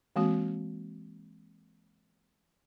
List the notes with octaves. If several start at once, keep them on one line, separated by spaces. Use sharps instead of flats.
E3 G#3 A#3 C4 F#4